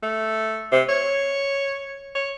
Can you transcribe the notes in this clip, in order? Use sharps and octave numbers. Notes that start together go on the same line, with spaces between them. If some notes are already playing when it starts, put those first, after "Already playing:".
A3
C3
C#5
C#5